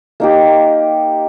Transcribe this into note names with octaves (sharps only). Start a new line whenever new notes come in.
A#3 D#4 G4